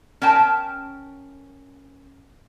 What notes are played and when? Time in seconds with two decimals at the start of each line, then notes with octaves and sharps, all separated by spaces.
0.22 C#4 A#4 G5 A5